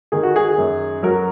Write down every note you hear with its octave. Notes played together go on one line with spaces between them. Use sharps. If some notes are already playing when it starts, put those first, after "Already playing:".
D#3 G#4
F#4
G#4
F#2
F#3 A#4